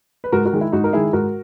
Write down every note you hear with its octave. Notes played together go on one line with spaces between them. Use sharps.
B4
G#2 F#4 A#4
F#4 A#4
D#3 G#3
E4
G#2 D#4 F#4
A#4
D#3 G#3 E4 G#4
G#2 F#4 A#4